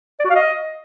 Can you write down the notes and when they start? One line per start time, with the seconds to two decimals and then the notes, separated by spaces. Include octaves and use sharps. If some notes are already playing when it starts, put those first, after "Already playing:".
0.19 D5
0.25 F#4
0.30 F5
0.35 D#5